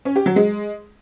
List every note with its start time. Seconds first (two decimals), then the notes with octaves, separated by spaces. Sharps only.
0.05 C#4
0.16 G4
0.26 F#3
0.36 G#3